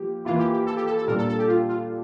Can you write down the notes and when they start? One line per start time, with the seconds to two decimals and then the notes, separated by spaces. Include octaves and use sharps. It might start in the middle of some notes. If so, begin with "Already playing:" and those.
Already playing: F3 A#3 G4
0.25 E3 A#3 E4 F4
0.39 G4
0.53 G4
0.66 A4
0.77 G4
0.86 A4
0.98 A4
1.08 A#2 G3 A#3 D4 A#4
1.18 A4
1.29 A4
1.39 G4
1.48 F4
1.69 F4